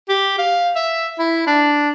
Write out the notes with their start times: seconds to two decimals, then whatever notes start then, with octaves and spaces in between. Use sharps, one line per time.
0.09 G4
0.39 F5
0.76 E5
1.19 E4
1.47 D4